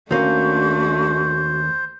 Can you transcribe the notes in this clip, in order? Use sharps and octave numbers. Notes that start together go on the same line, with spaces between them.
D#2 A3 A#3 C#4 D4 F#4 C5